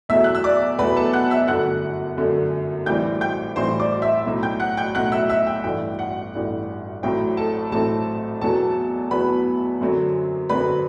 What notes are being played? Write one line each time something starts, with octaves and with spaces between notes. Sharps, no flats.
E2 B2 F#3 A3 E5 E6
F#6
E6
D5 D6
E2 B2 F#3 A3 B4 B5
A4 A5
F#5 F#6
E5 E6
G1 F#2 D3 A3 F#5 F#6
G1 F#2 D3 A3
A1 A2 E3 G3 C4 G5 G6
G5 G6
A1 A2 E3 G3 C4 C5 C6
D5 D6
E5 E6
B1 A2 F#3
G5 G6
F#5 F#6
G5 G6
B1 A2 F#3 F#5 F#6
E5 E6
E5 E6
G5
A1 G2 E3 A3 G5
F#5
A1 G2 E3 A3
A1 A2 F#3 C4 G5
A4 A5
A1 A2 F#3 C4 A4 A5
E2 B2 F#3 B3 A4 A5
E2 B2 F#3 B3 B4 B5
F#2 D3 F#3 C4
F#2 D3 F#3 C4 B4 B5